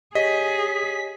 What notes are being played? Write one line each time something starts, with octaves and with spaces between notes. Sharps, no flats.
G4 G#4 C#5 D#5 B6